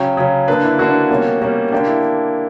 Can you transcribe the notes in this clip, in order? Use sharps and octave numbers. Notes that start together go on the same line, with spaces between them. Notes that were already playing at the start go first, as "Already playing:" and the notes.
Already playing: C#3 F#3 C#4 G5
C#3 F#3 C#4
D3 A#3 D4 B4
E4
D3 A#3 D4 F#4
B2 G3 A#3 C#4
B2 G3 A#3 C#4
D3 A#3 D4 G4
E4